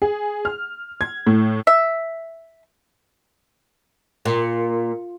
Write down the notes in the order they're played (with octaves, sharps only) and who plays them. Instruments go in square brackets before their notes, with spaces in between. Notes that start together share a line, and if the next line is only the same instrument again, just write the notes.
[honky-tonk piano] G#4
F6
G#6
A2
[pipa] E5
[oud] A#2